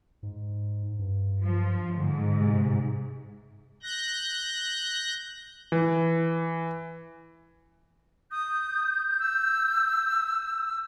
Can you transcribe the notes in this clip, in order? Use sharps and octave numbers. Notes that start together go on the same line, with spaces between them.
G#2
G2
F3
G#2 D3
C3
F#6 G6 A#6
E3
D#6 G6
E6